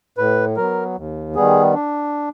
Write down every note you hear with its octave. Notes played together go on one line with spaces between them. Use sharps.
A2 B4
F#3 B3 A#4
D#2
D#3 G3 B3 G#4
D4